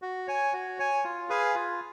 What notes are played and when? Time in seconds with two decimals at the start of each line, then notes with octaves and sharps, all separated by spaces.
0.02 F#4
0.28 C#5 G#5
0.53 F#4
0.79 C#5 G#5
1.04 F4
1.29 G#4 B4 F5 G#5
1.55 F4